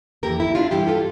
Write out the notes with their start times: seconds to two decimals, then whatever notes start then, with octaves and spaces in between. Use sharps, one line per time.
0.23 F2 E3 A#3 G4 A#4
0.40 E4
0.55 D4 F4
0.71 G2 E3 G3 E4 G4
0.88 F4 A4